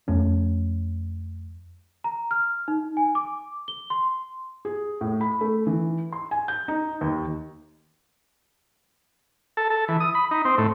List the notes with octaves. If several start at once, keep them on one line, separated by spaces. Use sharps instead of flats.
F2 A3 C#4
A#5
F6
D#4
G#5
D6
G7
C6
G#4
A2
B5
A3
E3
C6
G#5
G6
D#4
D#2
A4
A4
E3
D#6
B5
D#4
C4
A2